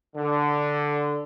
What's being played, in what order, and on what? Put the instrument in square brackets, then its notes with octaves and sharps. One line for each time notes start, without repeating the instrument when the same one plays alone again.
[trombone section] D3